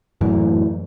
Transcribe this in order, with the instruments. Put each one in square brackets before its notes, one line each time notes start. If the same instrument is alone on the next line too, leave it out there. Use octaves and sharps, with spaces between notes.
[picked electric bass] F#2 A2 E3